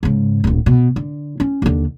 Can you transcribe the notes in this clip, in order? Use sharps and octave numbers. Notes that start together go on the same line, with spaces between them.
G#2 C#3
D1 A#1
B2
D3
C#4
D#2 D3